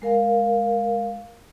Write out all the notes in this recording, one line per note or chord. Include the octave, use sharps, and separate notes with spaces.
G#3 A#4 F5